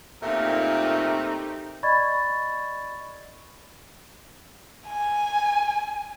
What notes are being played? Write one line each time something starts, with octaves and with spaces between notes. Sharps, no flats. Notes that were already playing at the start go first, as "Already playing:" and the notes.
A#2 A3 C4 D#4 G4 A#4
D5 D#5 B5 C#6 G#6 A6
G#5